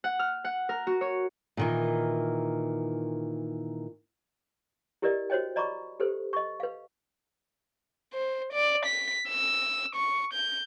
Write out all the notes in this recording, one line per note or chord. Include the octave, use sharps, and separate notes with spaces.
F#5
F6
F#5
A#4
F#4
C#5
A#2 D#3 E3
E4 G4 A#4 B4 D5 D#5
F#4 C5 C#5 D#5 G5
D5 D#5 A#5 B5 C#6 D6
G4 A4 B4 C5
D#5 C#6
B4 F5
C5
D5
B6
E6
C#6
G6